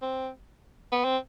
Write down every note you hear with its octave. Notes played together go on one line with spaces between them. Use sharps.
C4
B3
C4